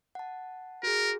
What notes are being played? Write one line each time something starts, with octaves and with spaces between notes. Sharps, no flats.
F#5 A5
F#4 G#4 A#4